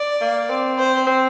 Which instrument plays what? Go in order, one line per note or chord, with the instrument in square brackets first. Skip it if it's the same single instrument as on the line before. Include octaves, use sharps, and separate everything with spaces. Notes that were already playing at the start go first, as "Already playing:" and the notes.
Already playing: [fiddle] D5
[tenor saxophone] A#3
C4
[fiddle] C5
[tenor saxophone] C4